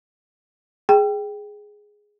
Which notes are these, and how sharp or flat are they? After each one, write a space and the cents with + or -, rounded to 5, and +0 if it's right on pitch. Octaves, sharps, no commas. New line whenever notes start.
G#4 +0 G5 +0